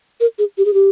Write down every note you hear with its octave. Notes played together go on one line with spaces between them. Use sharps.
A#4
G#4
G4
G#4
G4